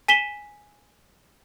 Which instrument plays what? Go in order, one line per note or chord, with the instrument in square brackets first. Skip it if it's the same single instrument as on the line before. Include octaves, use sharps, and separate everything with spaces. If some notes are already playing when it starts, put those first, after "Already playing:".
[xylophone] G#5 B6 E7 G7